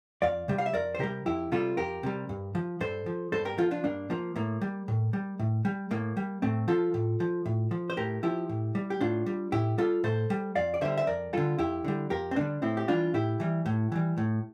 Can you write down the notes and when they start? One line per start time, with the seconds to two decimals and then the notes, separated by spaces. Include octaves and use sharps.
0.22 F2 D5 F5
0.48 C3 G3
0.58 F5
0.66 E5
0.74 F2 A#4 D5
0.95 C5
0.99 C3 G3 G4 A#4
1.26 F2 E4 G4
1.52 C3 G3 F4 A4
1.77 F2 G4 A#4
2.03 C3 G3
2.29 G2
2.55 F3
2.80 G2 A4 C5
3.06 F3
3.32 G2 A4 C5
3.45 G4 A#4
3.58 F3 F4 A4
3.71 D4 F4
3.84 G2 A#3 D4
4.10 F3 A#3
4.36 A2 A#3
4.61 G3
4.88 A2
5.13 G3
5.39 A2
5.65 G3
5.91 A2 A#3
6.17 G3
6.42 A2 A3 C4
6.68 F3 F4 A4
6.94 A2
7.20 F3
7.46 A2
7.71 F3
7.90 C5
7.97 A2 G4 A#4
8.23 F3 E4 G4
8.49 A2
8.75 G3
8.90 G4
9.01 A2 D4 F4
9.26 G3
9.52 A2 E4 G4
9.78 G3 F4 A4
10.04 A2 A4 C5
10.30 G3
10.55 F2 D5 F5
10.74 D5
10.81 D3 G3 C5 E5
10.97 E5
11.07 F2 A#4 D5
11.33 D3 G3 F4 A4
11.58 F2 E4 G4
11.84 D3 G3
12.10 F2 G4 A#4
12.31 C4
12.36 D3 G3 A#3 D4
12.62 A2 C4 E4
12.77 G4
12.88 E3 G3 D4 F4
13.14 A2 E4 G4
13.40 E3 G3
13.66 A2
13.92 E3 G3
14.18 A2